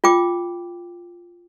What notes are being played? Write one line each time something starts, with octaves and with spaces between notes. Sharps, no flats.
F4 G5 D6